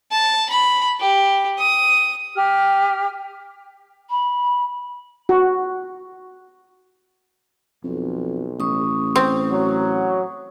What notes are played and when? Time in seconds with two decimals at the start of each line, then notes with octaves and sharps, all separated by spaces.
0.12 A5
0.50 B5
1.01 G4
1.59 D#6
2.36 G4 F6
4.10 B5
5.29 F#4
7.84 B1 F2
8.60 A1 C#6 D#6
9.16 C4
9.52 F#3